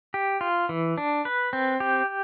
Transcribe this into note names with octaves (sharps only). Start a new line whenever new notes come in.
G4
F4
E3
D4
B4
C4
G4